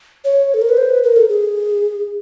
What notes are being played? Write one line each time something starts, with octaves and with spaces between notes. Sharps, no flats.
C#5
A4
A#4
B4
C5
B4
A#4
A4
G#4